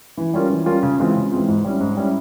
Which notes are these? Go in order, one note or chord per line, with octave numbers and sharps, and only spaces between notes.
E3
G3 C#4 F4 A#4
E3
G3 C#4 F4 A#4
C#3
E3 G#3 C4 F4
C#3
E3 G#3 C4 F4
G#2
G3 C#4 E4
G#2
G3 C#4 E4